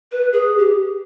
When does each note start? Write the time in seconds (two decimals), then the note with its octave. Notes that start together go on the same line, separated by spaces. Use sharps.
0.12 B4
0.33 G#4
0.58 G4